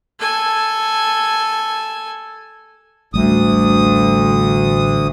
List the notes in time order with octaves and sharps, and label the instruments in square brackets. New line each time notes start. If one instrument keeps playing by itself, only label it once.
[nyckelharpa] A4 G#5
[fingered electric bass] A1 G3 A3 [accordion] D2 D#6